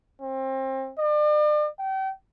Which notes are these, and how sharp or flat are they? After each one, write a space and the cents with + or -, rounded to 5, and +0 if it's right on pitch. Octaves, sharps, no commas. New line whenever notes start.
C4 +30
D5 +40
G5 -35